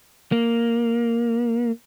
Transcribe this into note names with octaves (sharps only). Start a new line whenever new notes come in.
A#3